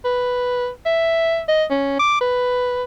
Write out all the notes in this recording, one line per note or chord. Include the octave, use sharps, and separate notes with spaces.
B4
E5
D#5
C#4
D6
B4